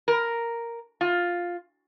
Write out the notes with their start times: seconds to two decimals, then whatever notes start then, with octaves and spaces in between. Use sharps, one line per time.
0.08 A#4
1.01 F4